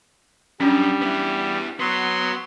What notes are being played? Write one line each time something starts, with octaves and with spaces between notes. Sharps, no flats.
F#2 G3 C#4 D4
B3 E4
F#3 B3 C6